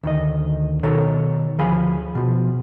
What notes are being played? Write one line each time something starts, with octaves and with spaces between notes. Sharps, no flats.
D2 D#3 D#5
B2 D#3 A4 C#5 A#5
D2 F3 G#4 F5 G#5 B5
B2 F3